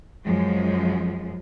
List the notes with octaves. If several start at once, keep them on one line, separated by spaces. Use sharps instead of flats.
F#2 F3 G#3